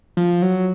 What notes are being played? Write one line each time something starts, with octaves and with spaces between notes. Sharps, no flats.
F3
F#3